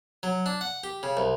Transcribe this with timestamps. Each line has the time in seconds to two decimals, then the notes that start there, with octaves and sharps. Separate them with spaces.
0.23 F#3
0.46 D4
0.61 F#5
0.84 G4
1.03 C#3
1.17 C2